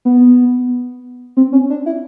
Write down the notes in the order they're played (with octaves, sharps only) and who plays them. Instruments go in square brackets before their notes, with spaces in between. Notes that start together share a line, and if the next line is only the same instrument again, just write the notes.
[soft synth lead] B3
C4
C#4
D4
E4